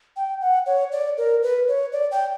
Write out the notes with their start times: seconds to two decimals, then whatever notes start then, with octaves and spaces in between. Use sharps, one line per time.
0.17 G5
0.41 F#5
0.66 C#5
0.92 D5
1.18 A#4
1.43 B4
1.68 C#5
1.93 D5
2.11 G5